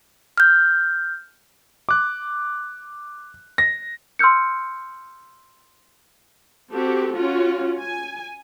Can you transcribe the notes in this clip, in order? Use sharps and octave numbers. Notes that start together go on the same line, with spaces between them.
F6 G6
D6 F#6
A#6
C6 E6 F6 G6 C#7
C4 F#4 G4 A4
C#4 F4 F#4
G#5